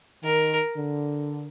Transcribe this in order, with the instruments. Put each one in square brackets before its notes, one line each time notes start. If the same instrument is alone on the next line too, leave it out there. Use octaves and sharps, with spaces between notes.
[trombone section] D#3 [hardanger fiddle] A#4
[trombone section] D3